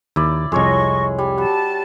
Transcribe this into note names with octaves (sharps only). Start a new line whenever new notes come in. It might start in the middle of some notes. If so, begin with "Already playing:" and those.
D#2 E4 D5
C2 F2 G#3 C#5 D#5 C#6
G3
G3 F#4 A5